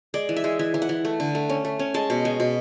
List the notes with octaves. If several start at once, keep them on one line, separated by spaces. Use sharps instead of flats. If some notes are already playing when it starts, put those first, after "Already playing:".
G#3 D5
E3
E5
G#3
E3 E5
E3
F#5
E3
A3
D3
A3
C#4
A3
C#4
G#3 A5
B2
G#3
B2